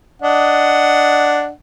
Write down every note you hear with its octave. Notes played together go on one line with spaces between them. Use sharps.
D4 D#5 F#5